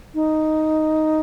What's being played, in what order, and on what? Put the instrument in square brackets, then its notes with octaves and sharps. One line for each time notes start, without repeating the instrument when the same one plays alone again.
[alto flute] D#4